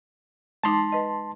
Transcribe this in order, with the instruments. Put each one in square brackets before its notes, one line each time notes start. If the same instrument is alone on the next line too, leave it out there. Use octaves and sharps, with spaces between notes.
[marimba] G#3 D#4 D6 [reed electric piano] A5 C6
[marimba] B4 D#5